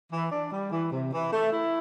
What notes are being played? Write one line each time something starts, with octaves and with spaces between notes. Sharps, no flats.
E3
D4
G3
E3
C3
E3
A3
E4